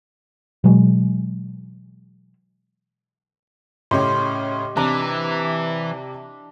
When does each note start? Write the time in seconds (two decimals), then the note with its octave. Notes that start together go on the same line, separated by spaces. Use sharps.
0.64 B2 E3 F#3 G#3
3.91 A2 C#3 G4 C#5 D#5 C6
4.77 C3 E3 D4 A#5